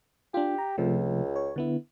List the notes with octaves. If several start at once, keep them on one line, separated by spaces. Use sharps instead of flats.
D4 F4 G4
A#5
C#2 C3 F3 A3
C#5
D3 B3 E4